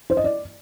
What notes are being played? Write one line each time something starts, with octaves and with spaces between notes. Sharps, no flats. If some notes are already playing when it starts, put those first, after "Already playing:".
C5
D#5
D5